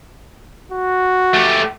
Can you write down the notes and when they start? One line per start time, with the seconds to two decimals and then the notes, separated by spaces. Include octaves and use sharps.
0.72 F#4
1.34 A3 G4